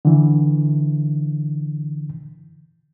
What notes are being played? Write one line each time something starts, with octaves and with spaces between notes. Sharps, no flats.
D3 E3